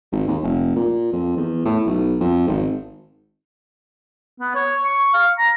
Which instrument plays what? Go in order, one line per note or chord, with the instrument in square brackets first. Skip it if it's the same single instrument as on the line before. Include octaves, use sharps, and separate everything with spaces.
[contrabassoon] G#1
D#2
F1
A#2
F2
E2
A2
B1
F2
G#1
[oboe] B3
C#5
C#6
F5
A#5